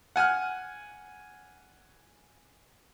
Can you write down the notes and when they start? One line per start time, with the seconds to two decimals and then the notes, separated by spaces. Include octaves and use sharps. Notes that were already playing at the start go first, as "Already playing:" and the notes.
0.16 F#5 G#5 F6 F#6